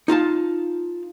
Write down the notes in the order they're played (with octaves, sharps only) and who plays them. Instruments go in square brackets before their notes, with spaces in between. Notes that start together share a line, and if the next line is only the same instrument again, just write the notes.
[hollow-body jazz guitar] D#4 F4 F5 A5